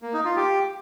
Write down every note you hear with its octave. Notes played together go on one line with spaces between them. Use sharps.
A#3
D#4
F4
G4